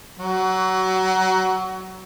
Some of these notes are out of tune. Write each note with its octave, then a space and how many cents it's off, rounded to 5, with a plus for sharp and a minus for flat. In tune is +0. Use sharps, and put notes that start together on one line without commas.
F#3 +25 F#4 +15